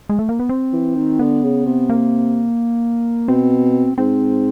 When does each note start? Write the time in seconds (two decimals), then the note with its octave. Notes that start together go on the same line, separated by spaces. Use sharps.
0.09 G#3
0.19 A3
0.29 A#3
0.40 B3
0.49 C4
0.73 E3
0.96 D#3
1.19 D3 B3
1.43 C#3
1.66 C3
1.90 A#3
3.28 B2 C4
3.98 G#2 C4